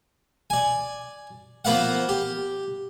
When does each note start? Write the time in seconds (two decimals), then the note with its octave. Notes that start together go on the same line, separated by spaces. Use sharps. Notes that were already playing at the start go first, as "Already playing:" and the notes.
0.50 D5 G#5
1.65 F3 A#3 B3 F5 F#5
2.09 G4